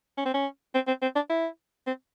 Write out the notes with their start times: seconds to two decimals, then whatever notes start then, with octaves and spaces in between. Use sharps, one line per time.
0.17 C#4
0.25 C4
0.34 C#4
0.74 C4
0.87 C4
1.02 C4
1.15 D4
1.29 E4
1.87 C4